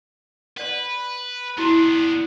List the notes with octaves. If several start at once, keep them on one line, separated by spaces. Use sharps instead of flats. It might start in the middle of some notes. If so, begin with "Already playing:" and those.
B4 D5 F#5
B3 D4 E4 F#4